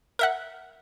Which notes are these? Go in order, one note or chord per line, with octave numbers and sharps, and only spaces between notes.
A#4 E5 F#5